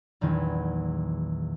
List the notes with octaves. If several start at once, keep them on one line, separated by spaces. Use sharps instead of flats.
A#1 E2 D#3 F#3 B4 G#6